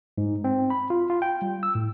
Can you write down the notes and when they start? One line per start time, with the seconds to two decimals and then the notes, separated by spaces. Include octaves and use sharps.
0.18 G#2
0.44 C4
0.70 B5
0.90 F4
1.10 F4
1.22 G5
1.42 G3
1.63 E6
1.75 A2